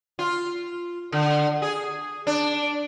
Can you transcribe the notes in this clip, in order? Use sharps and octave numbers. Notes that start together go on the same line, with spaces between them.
F4
D3
G#4
D4